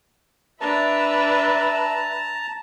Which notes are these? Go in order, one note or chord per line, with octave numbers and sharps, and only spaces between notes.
D4 B4 E5 A5 A#5